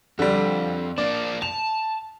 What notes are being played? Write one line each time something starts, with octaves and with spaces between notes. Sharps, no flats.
F2 D3 G3
A#3 D4 D5
A5 F7